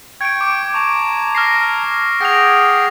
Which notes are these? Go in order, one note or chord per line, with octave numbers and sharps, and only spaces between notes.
G5 C#6 G#6 D7
D6
A5 A#5 C#6
F6 A#6 C7
G#4 F#5 G5 A#6 F7